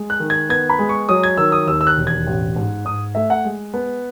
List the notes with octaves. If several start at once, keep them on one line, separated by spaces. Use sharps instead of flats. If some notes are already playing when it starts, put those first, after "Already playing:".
Already playing: G#3
F#6
D#3
G#6
B3 G#6
B5
G#3
C#6
F#3 D#6
G#6
D#3 E6
D#6
D#2 E6
E6
F#6
E1
G#6
A1
G#2
G#2 D#6
A3 E5
F#5
G#3
B3